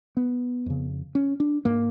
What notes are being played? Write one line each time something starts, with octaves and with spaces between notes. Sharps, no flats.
B3
F2 C#3
C#4
D4
G#2 A#3